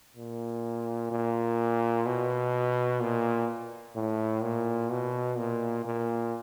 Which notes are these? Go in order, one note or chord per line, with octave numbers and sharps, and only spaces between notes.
A#2
A#2
B2
A#2
A2
A#2
B2
A#2
A#2